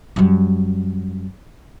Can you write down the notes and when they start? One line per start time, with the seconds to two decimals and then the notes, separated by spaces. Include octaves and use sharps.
0.16 F#2 G3